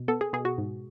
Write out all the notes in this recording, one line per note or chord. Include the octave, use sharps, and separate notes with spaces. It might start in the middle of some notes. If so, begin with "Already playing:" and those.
Already playing: B2
B3 A4
G#4
B2 G#4
F#4
G#2